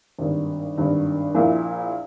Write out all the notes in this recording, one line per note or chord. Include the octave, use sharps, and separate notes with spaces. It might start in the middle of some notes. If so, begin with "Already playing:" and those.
G#1 G2 D#3
G#1 G2 D#3
A#1 A#2 A#3 E4